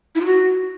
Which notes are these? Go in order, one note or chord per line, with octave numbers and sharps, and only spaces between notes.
E4
F4
F#4